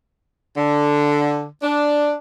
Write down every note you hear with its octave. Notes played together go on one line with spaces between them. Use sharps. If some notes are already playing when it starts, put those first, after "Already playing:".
D3
D4